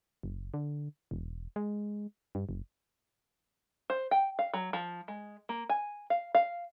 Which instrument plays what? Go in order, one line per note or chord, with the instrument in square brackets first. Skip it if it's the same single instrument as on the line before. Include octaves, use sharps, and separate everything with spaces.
[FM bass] F#1
D3
E1
G#3
G2
F#1
[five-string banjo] C5
G5
F5
F#3
F3
G#3
A#3
G#5
F5
F5